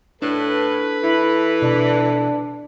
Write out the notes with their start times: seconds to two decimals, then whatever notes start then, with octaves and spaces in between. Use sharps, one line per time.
0.22 A2 D4 A4 B4
1.03 E3 E4
1.62 B2 D4